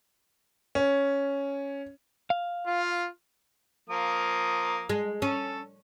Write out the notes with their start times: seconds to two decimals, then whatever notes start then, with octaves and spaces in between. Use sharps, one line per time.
0.75 C#4
2.30 F5
2.67 F4
3.90 F3 A#3 D#6
4.89 G#3
5.22 C#4 A4